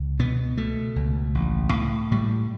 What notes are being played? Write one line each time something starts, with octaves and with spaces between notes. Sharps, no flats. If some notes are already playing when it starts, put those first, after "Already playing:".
Already playing: C#2
B2 B3
B2 A3
C#2
A1
A2
A2 G3